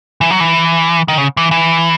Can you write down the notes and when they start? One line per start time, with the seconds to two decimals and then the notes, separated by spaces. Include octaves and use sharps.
0.21 E3
0.31 F#3
0.40 E3
1.08 D#3
1.18 C#3
1.37 E3
1.51 E3